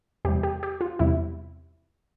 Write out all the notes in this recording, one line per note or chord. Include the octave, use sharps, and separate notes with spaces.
E2 C3 G3 G4
G4
G4
F4
E2 C3 G3 E4